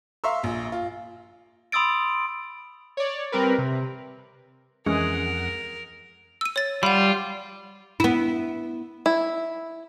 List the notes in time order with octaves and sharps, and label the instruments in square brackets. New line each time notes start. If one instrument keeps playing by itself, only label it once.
[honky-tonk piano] E5 F5 A#5 C6 C#6 E6
A#1
F4
[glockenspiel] B5 C6 D#6 E6 A6 D7
[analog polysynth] C#5 D5
G3 C4 A#4 B4
C3
[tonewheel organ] F2 F#5 [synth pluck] E3 G#3 C#4 [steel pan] G#4 [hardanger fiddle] A#4
[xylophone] E6 D#7
C#5 A6
[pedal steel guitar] G3 [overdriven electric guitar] F4 [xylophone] F#5 B5
[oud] B3 E4
[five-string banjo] E4